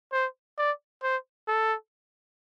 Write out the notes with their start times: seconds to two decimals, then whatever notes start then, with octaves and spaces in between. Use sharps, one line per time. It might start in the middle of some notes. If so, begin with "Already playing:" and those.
0.12 C5
0.58 D5
1.03 C5
1.47 A4